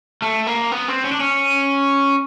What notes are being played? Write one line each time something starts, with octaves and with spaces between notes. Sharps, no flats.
A3
A#3
B3
C4
C#4
D4
C#4